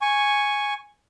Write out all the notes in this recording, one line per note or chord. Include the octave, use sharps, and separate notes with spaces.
G#5 C#6